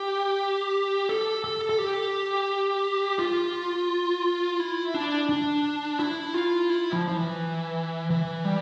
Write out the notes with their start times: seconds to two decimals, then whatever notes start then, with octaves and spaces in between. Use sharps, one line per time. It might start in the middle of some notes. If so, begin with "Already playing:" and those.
Already playing: G4
1.09 A4
1.44 A4
1.70 A4
1.78 G4
3.19 F4
4.60 E4
4.94 D4
5.29 D4
6.00 E4
6.34 F4
6.70 E4
6.93 F3
7.08 F3
7.17 E3
8.10 E3
8.45 G3